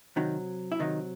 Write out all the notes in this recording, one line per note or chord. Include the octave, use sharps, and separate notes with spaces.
C3 D#3 F#3 D#4
E4
C3 D#3 F#3 D#4